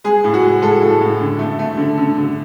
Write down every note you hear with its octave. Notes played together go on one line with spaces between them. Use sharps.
G#3 G#4
A2
F#4
G#3
G#3 A4
A2
A2
D3
A3
A3
D3
D3
D3